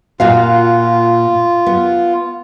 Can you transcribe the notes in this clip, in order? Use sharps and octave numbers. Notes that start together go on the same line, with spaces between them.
A#2 F4 F#4 F5
B3